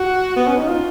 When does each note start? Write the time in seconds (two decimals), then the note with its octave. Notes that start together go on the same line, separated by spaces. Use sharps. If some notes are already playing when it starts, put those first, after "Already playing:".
Already playing: F#4
0.36 B3
0.47 C#4
0.57 D#4
0.68 F4